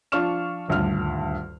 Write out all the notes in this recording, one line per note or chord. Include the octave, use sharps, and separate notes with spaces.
F3 D4 F4 C#6 F6 E7
D#1 D2 G2 F6